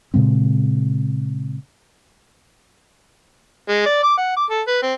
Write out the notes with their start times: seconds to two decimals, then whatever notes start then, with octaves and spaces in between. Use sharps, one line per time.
0.14 A#2 C#3 G#3 C4
3.69 G#3
3.86 D5
4.03 D6
4.18 F#5
4.36 D6
4.50 A4
4.67 B4
4.83 C4